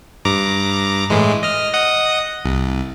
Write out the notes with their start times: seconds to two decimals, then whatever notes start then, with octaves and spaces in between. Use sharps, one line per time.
0.25 G2 A#5 D6
1.10 A2 E3 G#3
1.43 D#5 F6
1.73 D#5 F#5 D#6
2.45 C2